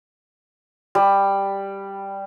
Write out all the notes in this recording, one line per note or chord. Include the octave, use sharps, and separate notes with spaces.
G3